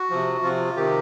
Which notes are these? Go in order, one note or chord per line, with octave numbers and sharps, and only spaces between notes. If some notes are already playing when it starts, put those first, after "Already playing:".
Already playing: F#4
C3 F3
C3 F3 F4
C3 D#3 G4